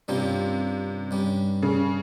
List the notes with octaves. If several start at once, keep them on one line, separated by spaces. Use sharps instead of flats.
G2 C3 G3 A#3 C#4 F4
G2 G3 C#4
C#3